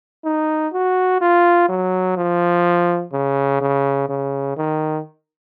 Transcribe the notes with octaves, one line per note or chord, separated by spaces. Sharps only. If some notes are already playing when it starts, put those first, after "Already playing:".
D#4
F#4
F4
F#3
F3
C#3
C#3
C#3
D#3